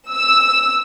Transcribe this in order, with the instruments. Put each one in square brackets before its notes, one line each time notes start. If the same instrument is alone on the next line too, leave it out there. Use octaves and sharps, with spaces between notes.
[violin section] E6